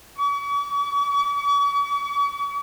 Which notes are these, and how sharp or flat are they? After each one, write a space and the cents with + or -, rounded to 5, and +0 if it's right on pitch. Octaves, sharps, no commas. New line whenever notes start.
C#6 +45